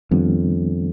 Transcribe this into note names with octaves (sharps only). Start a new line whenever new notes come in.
F2 D#3 G3 B3 D4